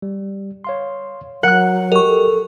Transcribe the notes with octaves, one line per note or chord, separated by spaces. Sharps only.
G3
C#5 F5 C6
F#3 A#4 F#5 F#6
G4 A#4 D#5 C#6
A4